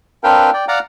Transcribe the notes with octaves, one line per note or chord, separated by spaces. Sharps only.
C4 D4 A#4 B4 F5 G5
D5 G5
D5 F5 F#5 A#5 D6